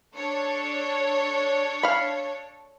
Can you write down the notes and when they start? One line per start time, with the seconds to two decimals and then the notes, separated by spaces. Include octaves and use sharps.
0.16 D4 A4 C#5
1.83 F5 B5